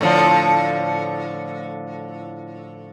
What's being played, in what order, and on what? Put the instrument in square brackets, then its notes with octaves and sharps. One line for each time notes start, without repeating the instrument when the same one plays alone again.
[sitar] A2 D3 F3